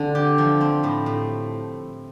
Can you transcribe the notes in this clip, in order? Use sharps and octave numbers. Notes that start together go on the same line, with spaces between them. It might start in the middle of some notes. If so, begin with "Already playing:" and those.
Already playing: D3 C4
G4
F3
C4
A2
A2